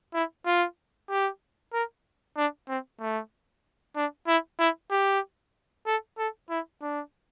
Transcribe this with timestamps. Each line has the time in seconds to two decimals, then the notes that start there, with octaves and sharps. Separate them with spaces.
0.14 E4
0.46 F4
1.10 G4
1.74 A#4
2.37 D4
2.68 C4
3.00 A3
3.96 D4
4.27 E4
4.59 E4
4.91 G4
5.86 A4
6.18 A4
6.50 E4
6.82 D4